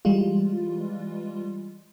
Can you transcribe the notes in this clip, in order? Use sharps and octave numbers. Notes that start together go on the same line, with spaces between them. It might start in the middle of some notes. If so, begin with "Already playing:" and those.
E3 G3 G#3 F4